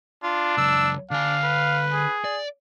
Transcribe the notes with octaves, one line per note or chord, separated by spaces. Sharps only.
D4 F4
C#2 F#2 E6
D3 D4 F5 G#5
B4
G#4
D5